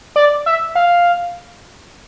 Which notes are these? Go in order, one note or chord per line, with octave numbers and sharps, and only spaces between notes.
D5
E5
F5